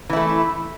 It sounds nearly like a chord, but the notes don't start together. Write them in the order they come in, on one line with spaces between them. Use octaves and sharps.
E3 E4 A3